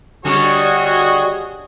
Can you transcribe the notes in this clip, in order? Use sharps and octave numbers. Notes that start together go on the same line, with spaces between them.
D3 G3 F#4 G#4 C#5 D#5